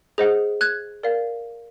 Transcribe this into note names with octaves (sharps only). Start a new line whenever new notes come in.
G#4 C5 D#5 F#5
F#6 G#6
A#4 D5 F5